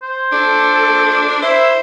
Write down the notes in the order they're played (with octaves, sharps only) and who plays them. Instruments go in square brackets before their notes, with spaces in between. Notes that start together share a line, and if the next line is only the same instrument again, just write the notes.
[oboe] C5
[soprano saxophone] D4 [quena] A4
[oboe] E4 [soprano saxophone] C5 [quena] E5